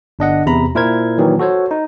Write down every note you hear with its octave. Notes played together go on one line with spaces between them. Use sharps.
G1 D4 D#5 F#5
E2 C3 A#5 B5
A#2 E4 A#4 C5 G#6
A#2 D#3 E3 F#3
F#4 A4 C5 C#5
D#4